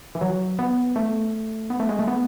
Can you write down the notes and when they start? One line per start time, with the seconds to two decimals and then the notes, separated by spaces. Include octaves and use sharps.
0.15 E3
0.21 F#3
0.59 B3
0.96 A3
1.70 B3
1.80 A3
1.89 G#3
1.99 A3
2.07 B3